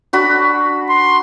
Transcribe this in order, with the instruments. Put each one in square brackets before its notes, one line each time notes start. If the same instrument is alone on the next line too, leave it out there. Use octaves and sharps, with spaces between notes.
[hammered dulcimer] D4 F#4 B5
[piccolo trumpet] C6